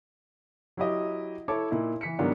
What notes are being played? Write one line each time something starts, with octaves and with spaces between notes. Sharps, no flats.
F#3 E4 G4 D#5
E4 A4 C#5 A5 D6
A#2 D#4 E4
E3 B6 C#7
G#2 D#3 F#3 G3 B3 D4